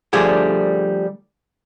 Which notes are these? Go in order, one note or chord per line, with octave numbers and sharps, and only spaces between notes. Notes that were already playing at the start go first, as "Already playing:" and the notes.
D3 F3 G3 A3 D4 G#4